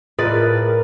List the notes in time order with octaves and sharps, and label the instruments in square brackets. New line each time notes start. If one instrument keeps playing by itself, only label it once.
[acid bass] A2 [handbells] F4 G#4 D#5 [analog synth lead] A#4 [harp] B4 D5